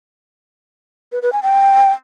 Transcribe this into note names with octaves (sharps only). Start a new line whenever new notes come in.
B4
B4
G#5
G5